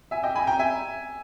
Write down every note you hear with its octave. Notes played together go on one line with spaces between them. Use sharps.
E5 G#5
D#5 G5
G#5 B5
G5 A#5
E5 G#5